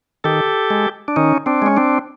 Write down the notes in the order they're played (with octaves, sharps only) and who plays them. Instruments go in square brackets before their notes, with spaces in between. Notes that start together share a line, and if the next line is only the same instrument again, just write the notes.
[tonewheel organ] D#3 G4 A4
G#3
D4
D#3 C#4 D#4
C4 D4
G#3 C#4
C4 D4